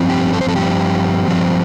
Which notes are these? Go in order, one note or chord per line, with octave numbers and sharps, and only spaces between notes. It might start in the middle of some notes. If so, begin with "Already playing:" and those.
Already playing: G2 F3 C4
G4
A4
C5
A4
G2 F3 C4 G4
G2 F3 C4